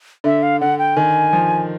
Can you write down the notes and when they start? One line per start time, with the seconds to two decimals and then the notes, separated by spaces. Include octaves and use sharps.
0.24 D3 E5
0.43 F5
0.61 D3 F#5
0.79 G5
0.97 D#3 G#5
1.33 F3